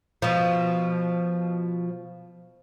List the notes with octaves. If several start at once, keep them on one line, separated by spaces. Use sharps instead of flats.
B2 F3